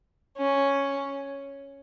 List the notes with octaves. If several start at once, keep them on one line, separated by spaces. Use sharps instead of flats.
C#4